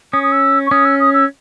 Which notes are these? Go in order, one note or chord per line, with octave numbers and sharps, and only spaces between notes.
C#4 D#6
D#6
E6
C#6
C#4 D#6
E6
D#6
E6